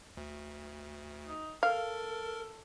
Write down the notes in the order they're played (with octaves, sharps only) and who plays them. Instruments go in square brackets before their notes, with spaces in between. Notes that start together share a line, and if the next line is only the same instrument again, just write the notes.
[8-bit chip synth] D2
[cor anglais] D#4
[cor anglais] A4 [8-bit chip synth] A#4 [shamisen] F5